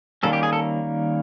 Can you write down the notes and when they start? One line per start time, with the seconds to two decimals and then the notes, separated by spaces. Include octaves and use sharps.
0.23 D#3 G3 A#3 C#4 A4
0.33 G4
0.43 G#4
0.53 A4